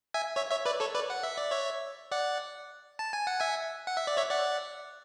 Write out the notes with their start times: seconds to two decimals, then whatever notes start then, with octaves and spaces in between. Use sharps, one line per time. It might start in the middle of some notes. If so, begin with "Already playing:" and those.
0.14 E5 G#5
0.36 C#5 E5
0.51 C#5 E5
0.66 B4 D5
0.80 A4 C#5
0.95 B4 D5
1.10 F#5
1.23 E5
1.38 D5
1.51 C#5 E5
2.11 D5 F#5
2.99 A5
3.13 G#5
3.27 F#5
3.40 E5 G#5
3.87 F#5
3.97 E5
4.07 D5
4.17 C#5 E5
4.31 D5 F#5